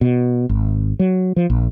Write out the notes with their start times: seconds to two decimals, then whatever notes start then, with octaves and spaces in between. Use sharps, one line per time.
0.01 B2
0.49 G#1
0.99 F#3
1.36 F3
1.50 A#1